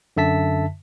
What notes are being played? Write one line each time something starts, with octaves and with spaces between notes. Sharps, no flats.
F#2 D3 E5 A5 B6